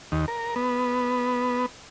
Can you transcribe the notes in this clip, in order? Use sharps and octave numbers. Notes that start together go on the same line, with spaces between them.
D#2
A#4
B3